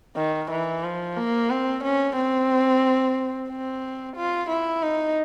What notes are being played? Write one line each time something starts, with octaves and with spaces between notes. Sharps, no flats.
D#3
E3
F3
A#3
C4
C#4
C4
C4
F4
E4
D#4